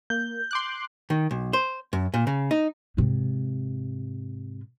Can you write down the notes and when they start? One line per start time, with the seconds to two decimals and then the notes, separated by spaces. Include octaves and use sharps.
0.10 A#3 G6
0.51 C6 D6 F#6
1.10 D#3
1.31 B1
1.53 C5
1.93 F#2
2.14 A#2
2.27 C#3
2.51 D#4
2.97 G#2 C3